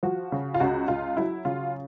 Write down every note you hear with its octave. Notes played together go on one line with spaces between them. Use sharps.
F3 F#4
C#3
F4
C#2 F#4
C#2 F4
F#3 E4
C#3 F4